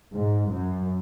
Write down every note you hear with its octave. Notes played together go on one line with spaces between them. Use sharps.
G#2
F#2